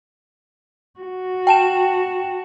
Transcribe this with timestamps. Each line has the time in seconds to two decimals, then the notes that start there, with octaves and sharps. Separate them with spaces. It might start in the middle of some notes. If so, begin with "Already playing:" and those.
1.00 F#4
1.47 G5 A5 E7